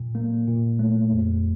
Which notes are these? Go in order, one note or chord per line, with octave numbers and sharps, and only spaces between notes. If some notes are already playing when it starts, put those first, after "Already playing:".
Already playing: A#2
A#3
A#2
A3
F2